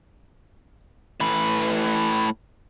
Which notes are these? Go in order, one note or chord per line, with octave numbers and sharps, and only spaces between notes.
A2 B4